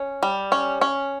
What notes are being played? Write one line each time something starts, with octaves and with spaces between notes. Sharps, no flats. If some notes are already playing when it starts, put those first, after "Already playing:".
Already playing: C#4
G3
C#4
C#4